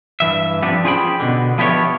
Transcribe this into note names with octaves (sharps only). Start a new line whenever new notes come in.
G2 E3 E5
F3 B3 C4 D4 G4
C#4 F4 G#4 C5 G5 B5
B2 D3
F3 B3 E4 G4 C5 C#5